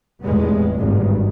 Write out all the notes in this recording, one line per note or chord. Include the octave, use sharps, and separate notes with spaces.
F1 E2 A2 G3 G#3 B3
G#1 D2 G2